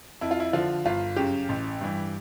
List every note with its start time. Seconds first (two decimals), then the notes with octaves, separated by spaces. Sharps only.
0.21 F2 E4
0.31 F4
0.40 E4
0.53 D3 F3 F4
0.85 G1 F4
1.16 F#2 C#3 G4
1.49 A1
1.81 G2 E3